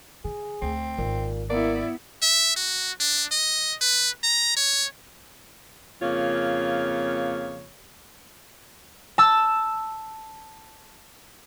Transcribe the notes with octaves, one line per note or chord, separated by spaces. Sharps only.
D3 G#4
D2 C4
G#1 A#2
A#3 B3 E4 D5
E5
F#4
D4
D#5
B4
A#5
C#5
F2 C#3 A#3 F4 C#5
A5 E6